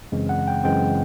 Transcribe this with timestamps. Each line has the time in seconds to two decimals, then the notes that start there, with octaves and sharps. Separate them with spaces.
0.12 F#2 C#3 E3 G#3 C4
0.29 F#5
0.47 G5
0.64 F#2 C#3 E3 G#3 C4 G5